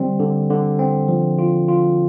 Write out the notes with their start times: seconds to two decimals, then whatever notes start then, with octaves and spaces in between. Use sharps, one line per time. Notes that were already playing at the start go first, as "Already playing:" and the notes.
Already playing: D3 G3 C4
0.20 D3
0.50 D3
0.79 C4
1.08 F3
1.39 F4
1.68 F4